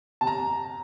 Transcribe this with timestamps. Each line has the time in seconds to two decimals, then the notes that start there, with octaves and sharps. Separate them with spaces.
0.21 C3 A5
0.27 A#5